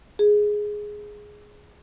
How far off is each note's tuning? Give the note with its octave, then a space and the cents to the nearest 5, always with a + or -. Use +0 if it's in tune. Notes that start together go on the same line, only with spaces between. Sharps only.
G#4 +5